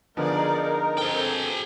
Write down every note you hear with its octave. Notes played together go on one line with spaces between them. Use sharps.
D3 F3 B3 D#4 G#4 A#4 D5
C4 G#4 A4 G5